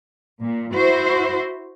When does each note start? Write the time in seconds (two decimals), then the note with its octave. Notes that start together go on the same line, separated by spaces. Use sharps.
0.42 A#2
0.74 E4 F#4 C5